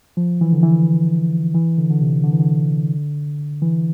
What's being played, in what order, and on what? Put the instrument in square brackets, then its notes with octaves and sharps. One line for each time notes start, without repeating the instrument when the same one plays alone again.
[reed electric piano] F3
E3
D3
E3
E3
D3
D3
C3
D3
E3
D3
E3